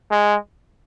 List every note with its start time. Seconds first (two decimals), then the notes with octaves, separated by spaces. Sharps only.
0.11 G#3